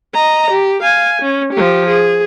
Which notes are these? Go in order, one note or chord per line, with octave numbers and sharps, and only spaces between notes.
D#5 A#5
G4
F5 G#5
C#4
F3 G4
G#4